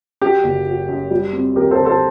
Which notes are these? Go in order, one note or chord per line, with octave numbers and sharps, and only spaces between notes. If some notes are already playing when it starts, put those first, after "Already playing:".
F#3 G4
F#1
F#3
F#2
G3
C4
D#2 G4 A#4
A4 C5
D3
A4 C5